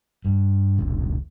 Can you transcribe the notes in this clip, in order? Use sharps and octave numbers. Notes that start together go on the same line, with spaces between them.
G2
F1 C#2